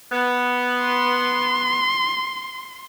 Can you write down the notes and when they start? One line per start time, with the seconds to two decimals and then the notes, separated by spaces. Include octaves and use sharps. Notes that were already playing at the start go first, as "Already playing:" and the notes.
0.12 B3
0.81 C6